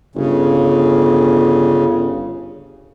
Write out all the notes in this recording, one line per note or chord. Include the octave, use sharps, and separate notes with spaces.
G1 C#3